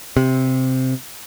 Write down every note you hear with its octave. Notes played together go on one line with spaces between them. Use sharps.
C3